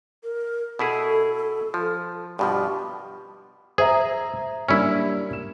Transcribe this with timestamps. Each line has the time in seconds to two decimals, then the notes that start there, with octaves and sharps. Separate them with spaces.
0.23 A#4
0.79 B2 E4 G#4 A4
1.74 F3
2.39 G2 B2 F3 G4
3.78 G#4 C5 E5 A#5
4.69 G3 A#3 C#4 D4 E4
5.33 E7